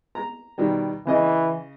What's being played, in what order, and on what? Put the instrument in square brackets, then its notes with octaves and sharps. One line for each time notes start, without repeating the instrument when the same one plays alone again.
[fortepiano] A#5
B2 D#3 G3
[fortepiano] C#3 D#5 [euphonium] E3